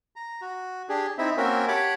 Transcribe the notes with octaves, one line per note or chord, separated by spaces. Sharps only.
A#5
F#4
D4 G4 G#4
C4 D#4 E4 E5
A#3 C4 C#4 F#4 A#4 E5
G4 C#5 F#5 A5 B5 D6